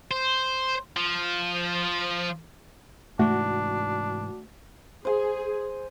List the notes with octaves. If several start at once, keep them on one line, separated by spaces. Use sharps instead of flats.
C5
F3
G#2 C3 E3 A3 D4 F#4
G#4 C5 G#5